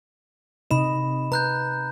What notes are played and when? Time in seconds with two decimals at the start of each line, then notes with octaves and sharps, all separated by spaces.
0.71 C3 D#4 D#5 B5 E7
1.32 B4 A#5 F#6 G6